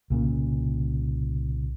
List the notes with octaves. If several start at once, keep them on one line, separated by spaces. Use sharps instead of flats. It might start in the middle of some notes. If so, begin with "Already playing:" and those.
C2 A#2 C#3